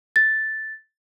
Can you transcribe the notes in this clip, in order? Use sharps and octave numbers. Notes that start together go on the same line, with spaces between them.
A6